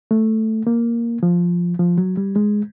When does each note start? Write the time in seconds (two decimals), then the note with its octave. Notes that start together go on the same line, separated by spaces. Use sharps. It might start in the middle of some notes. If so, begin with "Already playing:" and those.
0.11 A3
0.67 A#3
1.23 F3
1.80 F3
1.98 F#3
2.17 G3
2.36 G#3